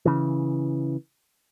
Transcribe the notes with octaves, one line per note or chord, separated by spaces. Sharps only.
C#3 E3